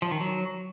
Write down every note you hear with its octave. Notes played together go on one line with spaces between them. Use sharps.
F3
D#3
F#3